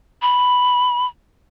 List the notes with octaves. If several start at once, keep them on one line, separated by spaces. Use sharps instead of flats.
B5